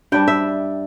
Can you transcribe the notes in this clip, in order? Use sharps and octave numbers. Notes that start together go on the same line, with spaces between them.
G2 G3 D4 G5
E5